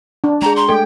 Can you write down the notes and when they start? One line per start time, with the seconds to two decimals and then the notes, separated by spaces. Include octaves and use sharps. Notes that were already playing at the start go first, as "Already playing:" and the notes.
0.24 D4
0.42 G#3 G#4 A#5
0.56 A#5 C6
0.69 A3 A4 G5